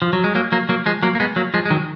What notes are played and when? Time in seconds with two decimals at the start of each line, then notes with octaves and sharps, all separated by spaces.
0.02 F3
0.13 F#3
0.24 G#3
0.35 F#3 A#3
0.52 F#3 A#3
0.69 F#3 A#3
0.86 F3 G#3
1.03 F#3 A#3
1.15 A#3
1.20 G#3 B3
1.36 F#3 A#3
1.54 F3 G#3
1.66 G#3
1.70 D#3 F#3